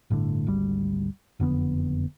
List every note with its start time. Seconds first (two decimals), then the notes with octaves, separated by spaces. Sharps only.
0.10 G1 A2 D3
0.47 G#1 D2 G3
1.40 F#1 F2 D3 B3